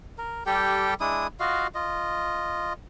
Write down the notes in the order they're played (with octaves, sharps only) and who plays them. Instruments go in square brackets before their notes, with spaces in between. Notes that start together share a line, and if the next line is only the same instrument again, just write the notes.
[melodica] A#4
G3 G4 A4 G5
G#3 D4 E4 D#6
F4 F#4 D#5 F5
F4 D#5